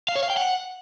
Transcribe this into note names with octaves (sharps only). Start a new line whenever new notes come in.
F5
C#5
F5
G5
F#5